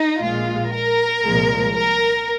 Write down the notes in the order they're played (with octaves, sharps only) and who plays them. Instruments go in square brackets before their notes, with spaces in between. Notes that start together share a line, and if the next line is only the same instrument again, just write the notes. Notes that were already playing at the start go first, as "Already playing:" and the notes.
Already playing: [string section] D#4
A#1 A#2 G#3 F4
A#4
C2 A#2 F3 G#3
A#4